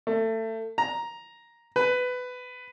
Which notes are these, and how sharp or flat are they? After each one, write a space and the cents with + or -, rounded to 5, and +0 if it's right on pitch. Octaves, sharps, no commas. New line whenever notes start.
A3 +25
A#5 +5
B4 +15